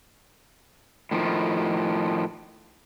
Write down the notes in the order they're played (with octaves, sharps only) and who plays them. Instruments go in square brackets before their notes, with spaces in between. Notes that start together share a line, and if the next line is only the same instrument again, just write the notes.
[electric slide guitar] A2 D#3 F3